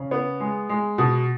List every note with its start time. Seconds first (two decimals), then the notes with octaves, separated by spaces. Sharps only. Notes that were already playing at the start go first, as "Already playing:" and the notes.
Already playing: C#3
0.11 B3
0.40 G#3
0.69 G#3
0.98 B2